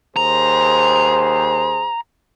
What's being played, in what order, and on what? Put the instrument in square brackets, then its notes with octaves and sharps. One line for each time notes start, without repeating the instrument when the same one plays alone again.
[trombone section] D#2 G#4 C5 [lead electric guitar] A#5